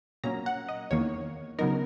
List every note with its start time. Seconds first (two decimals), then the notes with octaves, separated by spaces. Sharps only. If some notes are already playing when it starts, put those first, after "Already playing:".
0.24 A#2 F#3 A#3 C#4 A#5
0.46 F#5
0.69 D#5
0.91 E2 D#3 A#3 C#5
1.59 C#3 F#3 B3 D#4 A#4